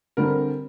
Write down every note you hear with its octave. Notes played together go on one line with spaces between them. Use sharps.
D3 G3 C4 A#4